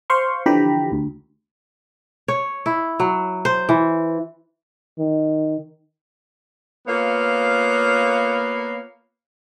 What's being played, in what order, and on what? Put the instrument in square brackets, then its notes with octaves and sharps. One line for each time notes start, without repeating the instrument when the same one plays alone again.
[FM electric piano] C5 F5 C6 C#6
D3 E3 F3 G4 A#5 B5
D2
[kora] C#5
E4
F#3
C5
E3
[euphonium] D#3
[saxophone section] A#3 B3 F4 C#5 F5